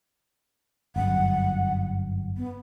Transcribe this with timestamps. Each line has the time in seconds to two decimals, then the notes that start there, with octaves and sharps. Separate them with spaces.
0.96 G1 F#2 F#5
2.37 B3